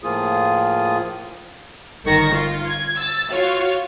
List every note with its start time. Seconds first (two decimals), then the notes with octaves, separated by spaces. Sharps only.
0.04 A2 F3 A#3 F4 G#4 D#6
2.04 G1 D#3 C#6 A#6
2.33 F4
2.67 G#6
2.97 E6 A6
3.31 F4 F#4 C#5 F5